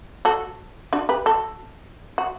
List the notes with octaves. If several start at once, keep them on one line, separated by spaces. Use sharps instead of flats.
F#4 A4
D4 F#4
G4 B4
F#4 A4
F#4